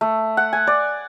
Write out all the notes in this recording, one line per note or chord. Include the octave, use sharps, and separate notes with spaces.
A3
F#5
G#5
D5